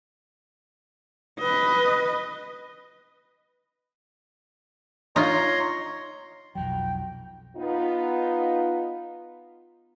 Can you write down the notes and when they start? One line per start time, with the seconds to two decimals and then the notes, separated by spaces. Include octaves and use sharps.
1.40 B4 D#5
5.16 D#4 F4 C#5 A#5 C6
6.55 B1 F2 F#3 G5
7.57 B3 D#4 F4